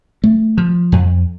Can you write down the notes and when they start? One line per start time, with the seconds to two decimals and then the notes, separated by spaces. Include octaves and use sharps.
0.24 A3
0.58 F3
0.92 F2